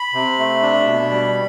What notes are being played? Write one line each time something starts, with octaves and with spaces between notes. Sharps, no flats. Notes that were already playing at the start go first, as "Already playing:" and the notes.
Already playing: B5
C3
A3
D4
B2
G3